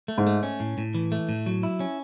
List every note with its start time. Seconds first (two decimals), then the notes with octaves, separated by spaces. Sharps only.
0.08 A3
0.18 G#2
0.27 A3
0.43 C#4
0.60 A2
0.78 A2
0.95 E3
1.12 A3
1.29 A2
1.46 F#3
1.63 E4
1.80 C#4